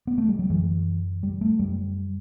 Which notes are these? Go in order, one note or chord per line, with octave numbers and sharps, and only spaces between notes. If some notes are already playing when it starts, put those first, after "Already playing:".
B3
A3
G3
F#3
F#2 D3 E3
G3
A3
F#2 D3 G3